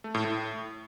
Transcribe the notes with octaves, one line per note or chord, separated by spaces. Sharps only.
A3
A2
A2